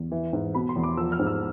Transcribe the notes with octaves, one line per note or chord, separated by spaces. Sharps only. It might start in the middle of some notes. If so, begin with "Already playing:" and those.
Already playing: E2
E3
G#2
B2 B5
C6
E2
D6
F3 E6
F6
G#2
E6